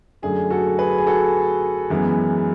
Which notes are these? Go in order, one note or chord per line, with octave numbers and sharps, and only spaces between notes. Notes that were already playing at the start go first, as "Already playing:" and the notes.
F#2 D3 A3 G#4
F#4 A4
G#4 B4
G#4
F#4 A4
F#2 E3 G#3 B3